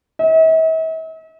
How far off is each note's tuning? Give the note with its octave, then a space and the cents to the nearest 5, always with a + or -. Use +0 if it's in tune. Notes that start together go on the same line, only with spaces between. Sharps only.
E5 -45